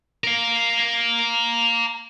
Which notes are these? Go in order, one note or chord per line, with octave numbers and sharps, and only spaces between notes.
A#4 F5